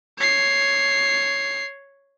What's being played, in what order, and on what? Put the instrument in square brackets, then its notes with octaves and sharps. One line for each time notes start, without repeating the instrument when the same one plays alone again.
[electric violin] C#5 C7